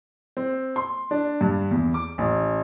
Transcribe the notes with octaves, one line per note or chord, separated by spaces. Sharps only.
C4
C6
D4
G2
E2
D6
A1